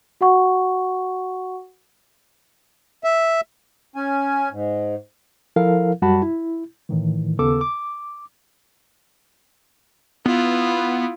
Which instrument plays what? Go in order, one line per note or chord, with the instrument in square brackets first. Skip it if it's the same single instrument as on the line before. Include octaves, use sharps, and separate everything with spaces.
[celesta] F#4 F#5 C#6
[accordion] E5
[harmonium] C#4 G#5
G#2
[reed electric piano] F3 E4 A4 A#4 F5
F#2 G3 F#4 F#5 A5 B5
E4
A2 D#3 E3
D#2 C#3 B3 A4 D6 E6
D6
[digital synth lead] B3 [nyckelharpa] E4 F4